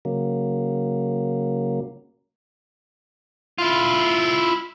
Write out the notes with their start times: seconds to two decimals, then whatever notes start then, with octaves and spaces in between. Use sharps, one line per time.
0.05 C#3 F#3 A#3
3.58 E4 F4